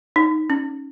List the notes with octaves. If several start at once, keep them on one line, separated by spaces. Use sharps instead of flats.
D#4
C#4